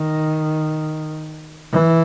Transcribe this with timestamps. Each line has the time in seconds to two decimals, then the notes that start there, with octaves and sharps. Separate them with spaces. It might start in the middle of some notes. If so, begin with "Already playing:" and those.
Already playing: D#3
1.73 E3